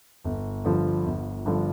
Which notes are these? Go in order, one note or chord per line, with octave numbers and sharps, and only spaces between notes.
G1
G2 D3 F3
G1
G2 D3 F3